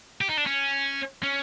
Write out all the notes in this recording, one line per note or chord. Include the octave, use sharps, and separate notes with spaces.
G4
D#4
D4
C#4
C#4